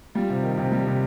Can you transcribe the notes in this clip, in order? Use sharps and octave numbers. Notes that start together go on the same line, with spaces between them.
G3 F4
C3
D#3
C3
G3
C3